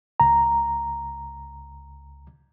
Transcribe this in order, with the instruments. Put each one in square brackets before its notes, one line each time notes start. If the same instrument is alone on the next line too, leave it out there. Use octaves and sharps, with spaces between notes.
[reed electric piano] C#2 A#5